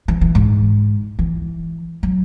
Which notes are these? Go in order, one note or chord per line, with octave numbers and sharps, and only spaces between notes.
E3
E3
G#2
E3
F#3